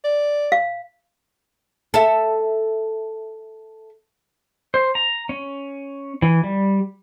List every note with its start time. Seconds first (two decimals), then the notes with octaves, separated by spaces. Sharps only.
0.04 D5
0.52 F5
1.94 A4 E5
4.74 C5
4.95 A#5
5.29 C#4
6.22 E3
6.44 G3